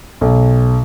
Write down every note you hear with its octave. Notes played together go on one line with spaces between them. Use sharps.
B1